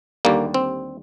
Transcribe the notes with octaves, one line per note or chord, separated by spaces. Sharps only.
D#2 D3 G3 A#3
C4